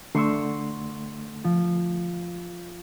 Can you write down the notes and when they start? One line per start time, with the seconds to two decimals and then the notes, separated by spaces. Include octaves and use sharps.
0.15 D3 A3 C6 C#6 E6
1.44 F3